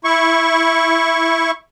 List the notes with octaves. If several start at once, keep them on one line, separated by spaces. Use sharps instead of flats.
E4 C#6